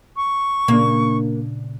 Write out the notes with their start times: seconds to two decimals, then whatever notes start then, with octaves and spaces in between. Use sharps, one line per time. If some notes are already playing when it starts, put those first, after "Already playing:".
0.16 C#6
0.68 A#2 C#3 A#3 D4